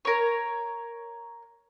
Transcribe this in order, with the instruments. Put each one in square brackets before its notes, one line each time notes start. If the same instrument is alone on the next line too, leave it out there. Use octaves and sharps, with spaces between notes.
[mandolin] A#4 C#5